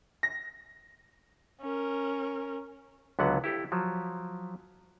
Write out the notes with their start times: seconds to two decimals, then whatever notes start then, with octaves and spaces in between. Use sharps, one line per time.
0.23 A#6
1.61 C#4 A#4
3.19 C#2 D3 F#3 B3 F#5
3.44 E4 G4 A4
3.72 F3 F#3